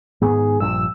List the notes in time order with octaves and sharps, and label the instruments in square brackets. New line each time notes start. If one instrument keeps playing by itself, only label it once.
[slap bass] G#2 D#3 B3 [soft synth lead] G#4
[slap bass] A#1 G2 F3 [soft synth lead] E6